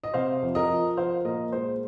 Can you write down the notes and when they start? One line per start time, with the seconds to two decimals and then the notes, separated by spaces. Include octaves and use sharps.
0.03 D#5
0.14 C3 C5 F5
0.42 F2
0.55 A#4 D#5
0.70 F3
0.97 F3 C5 F5
1.25 A#2 A#4 D#5
1.52 G#3 C5